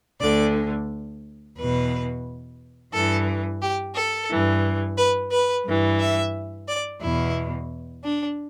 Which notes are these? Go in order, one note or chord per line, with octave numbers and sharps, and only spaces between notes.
D2 D3 D5
E2 B2 B4
G2 E3 A4
G4
A4
G2 E3
B4
B4
G2 E3
E5
D5
E2 B2 E4
D4